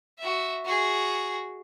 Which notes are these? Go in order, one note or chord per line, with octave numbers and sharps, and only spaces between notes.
F#4 E5
F#4 G#4